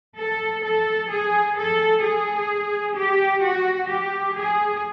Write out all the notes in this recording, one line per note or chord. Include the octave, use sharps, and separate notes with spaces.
A4
A4
G#4
A4
G#4
G4
F#4
G4
G#4